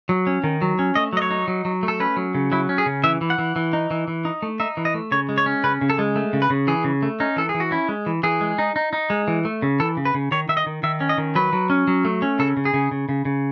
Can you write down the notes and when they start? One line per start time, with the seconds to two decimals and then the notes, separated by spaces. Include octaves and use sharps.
0.09 F#3
0.27 C#4
0.44 D#3
0.62 F#3
0.79 C#4
0.95 A3 D#5
1.13 F#3 D#5
1.22 C#5
1.31 D#4
1.48 F#3
1.65 F#3
1.83 A3
1.88 A4
2.00 C#4 B4
2.17 F#3
2.35 C#3
2.52 F#3 E4
2.69 C#4
2.78 G#4
2.86 C#3
3.04 E3 E5
3.21 E3
3.30 F#5
3.38 E3
3.56 E3
3.73 D#4
3.91 E3
4.08 E3
4.25 D#4
4.42 A3
4.60 D#4 E5
4.77 E3
4.85 D#5
4.94 A3
5.11 C#3 C#5
5.29 G#3
5.38 C#5
5.46 C#4
5.64 C#3 B4
5.81 C#3
5.90 A4
5.99 G#3
6.16 A3
6.33 C#3
6.42 B4
6.50 C#3
6.67 E3 G#4
6.84 C#3
7.03 A3
7.20 C#4 D#4
7.36 E3 A4
7.49 G#4
7.54 E3
7.60 F#4
7.71 C#4 E4
7.89 G#3
8.06 E3
8.23 E3 G#4
8.41 G#3
8.58 D#4
8.76 D#4
8.93 D#4
9.10 G#3
9.28 E3
9.45 A3
9.62 C#3
9.80 E3 A4
9.97 C#3
10.05 B4
10.14 C#3
10.31 D#3 C#5
10.49 D#3 E5
10.57 D#5
10.66 D#3
10.83 D#3 E5
11.00 C#4
11.09 D#5
11.18 D#3
11.35 F#3 B4
11.53 F#3
11.70 C#4
11.87 F#3
12.05 A3
12.22 C#4
12.39 C#3 A4
12.57 C#3
12.65 G#4
12.74 C#3
12.91 C#3
13.09 C#3
13.25 C#3